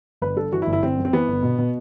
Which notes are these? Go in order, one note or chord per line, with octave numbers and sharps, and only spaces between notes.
G1 B4
G2 A4
E3 F#4
E4
G1
E4
G1 C4
F#2
C4
E3 B3
G1
B2
B2